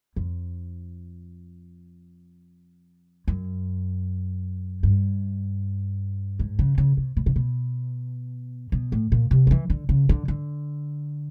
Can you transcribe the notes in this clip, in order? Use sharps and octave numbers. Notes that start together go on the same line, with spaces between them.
F2
F#2
G2
G#2
C#3
C#3
C3
B2
C3
B2
B2
A2
A#2
C3
F3
E3
D3
C#3
D3
D3